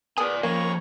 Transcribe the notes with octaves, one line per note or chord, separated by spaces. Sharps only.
B3 G#4 A#4 D5 G#5
F3 A#3 C#5 D#5 A#5 C#6